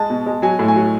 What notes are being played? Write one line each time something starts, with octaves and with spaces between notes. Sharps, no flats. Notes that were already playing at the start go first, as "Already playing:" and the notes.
Already playing: G#3 A5
B2
G#3
F#3 G#5
A2
G#5
F#3